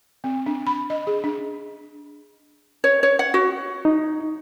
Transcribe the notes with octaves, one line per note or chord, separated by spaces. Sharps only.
C4
D4
B5
D#5
G#4
D4
C#5
C#5
F#5
F#4
D#4